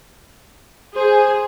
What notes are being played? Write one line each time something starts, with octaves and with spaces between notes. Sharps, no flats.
G#4 C5